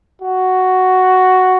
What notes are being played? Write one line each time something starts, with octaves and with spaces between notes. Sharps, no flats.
F#4